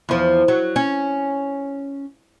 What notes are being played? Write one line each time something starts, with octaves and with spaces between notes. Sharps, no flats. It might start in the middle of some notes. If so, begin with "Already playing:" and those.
E2 F3
F#3
C#4